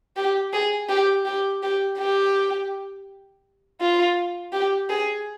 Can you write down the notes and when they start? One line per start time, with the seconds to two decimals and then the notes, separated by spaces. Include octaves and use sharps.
0.17 G4
0.53 G#4
0.89 G4
1.26 G4
1.63 G4
1.98 G4
3.81 F4
4.53 G4
4.89 G#4